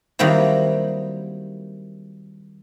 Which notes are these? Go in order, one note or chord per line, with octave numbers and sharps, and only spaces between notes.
D#3 F#3 G3 A#3 C4 E4